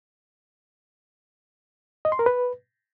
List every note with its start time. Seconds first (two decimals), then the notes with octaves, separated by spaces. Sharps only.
2.05 D#5
2.12 C6
2.19 A#4
2.26 B4